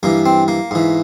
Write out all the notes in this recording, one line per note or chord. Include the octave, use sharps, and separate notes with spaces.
G2 E3 A#3
C4
A#3
G#2 E3